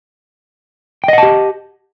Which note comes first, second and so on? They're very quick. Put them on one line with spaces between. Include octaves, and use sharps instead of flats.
G5 D#5 F#5 A5 G4